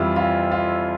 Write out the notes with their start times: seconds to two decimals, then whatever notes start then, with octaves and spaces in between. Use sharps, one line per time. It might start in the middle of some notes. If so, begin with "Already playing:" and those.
Already playing: F2 E3 G3 E4 F4
0.16 F4
0.51 F4